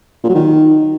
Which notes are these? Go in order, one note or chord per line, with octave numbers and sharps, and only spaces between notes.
A#2
F#3
D#3